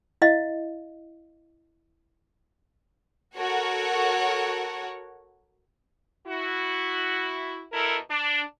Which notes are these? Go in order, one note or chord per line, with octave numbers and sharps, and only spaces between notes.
E4 D#5 F5
F#4 A4 A#4 C#5 F#5
E4 F#4
B2 E4 A4 A#4
D4